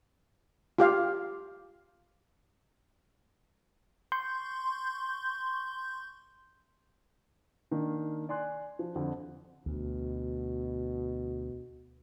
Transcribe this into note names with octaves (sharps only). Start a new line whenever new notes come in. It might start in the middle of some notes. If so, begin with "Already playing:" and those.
F4 G4 F5
C6 C#6 G6
D#3 A#3 D4
D5 G#5 C6 F#6
F3
F2 D3 F3
D2 B2